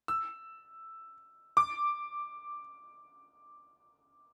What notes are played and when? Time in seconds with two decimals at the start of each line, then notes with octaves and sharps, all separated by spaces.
0.08 E6
1.57 D6